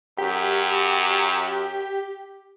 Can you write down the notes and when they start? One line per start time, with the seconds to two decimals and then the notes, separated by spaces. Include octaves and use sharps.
0.18 F#2 G4